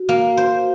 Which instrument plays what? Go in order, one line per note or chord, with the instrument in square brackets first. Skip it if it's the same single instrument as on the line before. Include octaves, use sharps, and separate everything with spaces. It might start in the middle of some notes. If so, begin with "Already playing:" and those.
Already playing: [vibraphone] F#4
[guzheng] A#3
C5